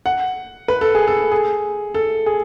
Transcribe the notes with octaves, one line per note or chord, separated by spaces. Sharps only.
F#5
B4
A4
G#4
A4
G#4
A4
G#4